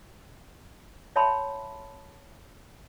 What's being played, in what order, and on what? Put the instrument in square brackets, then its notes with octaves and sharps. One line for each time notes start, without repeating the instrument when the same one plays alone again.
[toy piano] C#5 E5 G5 A5 B5 C6